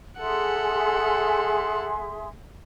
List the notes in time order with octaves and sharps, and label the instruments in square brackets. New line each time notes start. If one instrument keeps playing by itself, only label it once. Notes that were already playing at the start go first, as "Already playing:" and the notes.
[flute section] G#4 E5 C6 [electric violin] A4 F#5